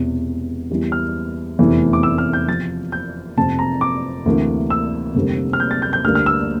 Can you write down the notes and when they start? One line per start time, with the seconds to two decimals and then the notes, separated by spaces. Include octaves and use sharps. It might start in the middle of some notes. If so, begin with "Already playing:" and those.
Already playing: E1 E2 C3
0.70 E2 E3 G3 A#3
0.92 F6
1.59 F1 E2 C3 E3 A3
1.93 D6
2.03 E6
2.18 F6
2.33 G6
2.48 E2 C3 F3 A6
2.92 G6
3.37 F1 F2 C3 F3 A5
3.59 A#5
3.81 D6
4.26 D2 C3 E3 A#3
4.70 E6
5.15 F1 F2 D3 G3 A#3
5.53 F6
5.60 G6
5.71 A6
5.82 G6
5.93 G6
6.04 D2 D3 G3 A#3 F6
6.15 F6
6.26 E6